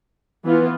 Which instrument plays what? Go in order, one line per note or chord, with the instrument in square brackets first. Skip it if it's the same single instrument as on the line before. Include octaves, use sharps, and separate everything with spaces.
[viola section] E3 B3 F4